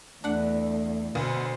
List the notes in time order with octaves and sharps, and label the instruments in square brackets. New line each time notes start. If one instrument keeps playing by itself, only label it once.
[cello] E2 [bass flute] A3 [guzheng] D4 F#5
[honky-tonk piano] D2 [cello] B2 C5